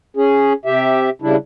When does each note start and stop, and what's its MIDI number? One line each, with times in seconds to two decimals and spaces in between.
0.17 0.53 61
0.17 0.53 68
0.65 1.10 48
0.65 1.10 67
0.65 1.10 76
1.22 1.36 49
1.22 1.36 55
1.22 1.36 62
1.22 1.36 64